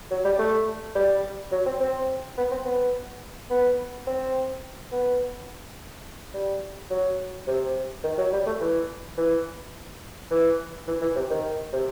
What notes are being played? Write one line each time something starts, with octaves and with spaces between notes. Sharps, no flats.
F#3
G3
A3
G3
F#3
C4
C4
B3
C4
B3
B3
C4
B3
G3
F#3
C3
D#3
F#3
G3
A3
E3
E3
E3
E3
E3
C3
D#3
C3